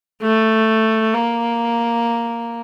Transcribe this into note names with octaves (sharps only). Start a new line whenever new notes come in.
A3
A#3